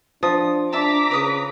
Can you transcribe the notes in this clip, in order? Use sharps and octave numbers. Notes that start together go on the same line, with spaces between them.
F3 D4 D#6
D4 E5 A5 A#5 D6 B6
C#3 B4 D#6